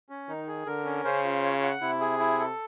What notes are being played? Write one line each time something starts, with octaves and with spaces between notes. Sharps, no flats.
C#4
D#3 D#4
G#4
D3 A#4
C#4
C#3 C5
F4
C#5
F#5
C3 E4
G#4
E4
A4